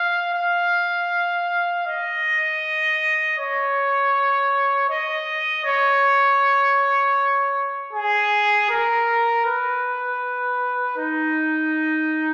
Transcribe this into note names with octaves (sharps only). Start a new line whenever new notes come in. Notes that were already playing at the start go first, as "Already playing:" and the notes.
Already playing: F5
F5
D#5
C#5
D#5
C#5
G#4
A#4
B4
D#4